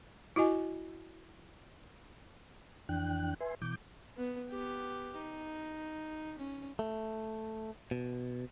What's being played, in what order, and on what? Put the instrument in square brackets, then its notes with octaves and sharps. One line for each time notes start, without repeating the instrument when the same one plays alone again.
[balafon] E4 F#4 D#5 G#5
[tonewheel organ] F2 E3 D4 G5 F#6
B4 E5 G#5 C6
B2 E3 D6 G6
[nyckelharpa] B3
B3 G4
D#4
C#4
[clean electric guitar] A3
B2